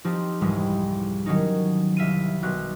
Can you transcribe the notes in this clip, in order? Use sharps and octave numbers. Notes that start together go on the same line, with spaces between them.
F3 C4 D#4 G4
C2 F2 G#2 E3 G3 G#3
D#3 F#3 C#4 D#4
C2 E5 F5 D#7
B1 F#3 F#6